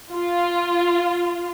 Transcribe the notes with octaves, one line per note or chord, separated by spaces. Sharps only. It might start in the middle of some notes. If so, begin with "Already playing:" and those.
F4